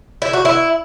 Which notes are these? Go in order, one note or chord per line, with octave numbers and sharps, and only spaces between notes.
E4
F#4
E4